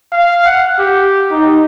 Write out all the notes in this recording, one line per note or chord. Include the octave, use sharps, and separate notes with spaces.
F5
F#5
G4
D#4